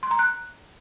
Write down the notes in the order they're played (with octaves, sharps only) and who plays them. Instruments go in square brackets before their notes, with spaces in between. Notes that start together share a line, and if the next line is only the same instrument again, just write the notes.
[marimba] C6
A#5
F#6